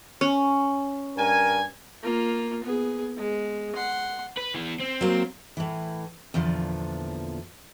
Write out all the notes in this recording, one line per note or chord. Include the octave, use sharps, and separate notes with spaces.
C#4
G2 A#4 G#5
A#3 F4
B3 G#4
G#3
F#5 C6
B4
E3 B3
C4
F#3 A#3
A2 E3
E2 A#2 D3 F3